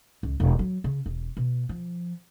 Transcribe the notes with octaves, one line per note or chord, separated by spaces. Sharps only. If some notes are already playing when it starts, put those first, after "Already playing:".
C#2
E1
F#3
C#3
E1
B2
F3